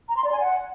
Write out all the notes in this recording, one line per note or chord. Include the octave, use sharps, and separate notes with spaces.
A#5
C6
D5
G#5
F#5